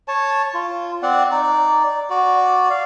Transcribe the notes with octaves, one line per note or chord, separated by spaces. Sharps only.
C#5 A5
F4
C4 D5 F#5
D#4 D5
F#4 D5
F5